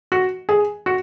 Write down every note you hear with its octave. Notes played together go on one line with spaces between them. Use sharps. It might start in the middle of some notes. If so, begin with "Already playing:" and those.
F#4
G#4
F#4